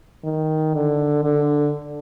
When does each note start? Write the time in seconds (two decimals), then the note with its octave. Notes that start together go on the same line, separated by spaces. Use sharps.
0.24 D#3
0.74 D3
1.24 D3